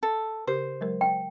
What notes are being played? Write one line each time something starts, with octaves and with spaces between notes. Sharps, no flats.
A4
C#3 G4 A#4 C5
F#3 G#3 A#4
G5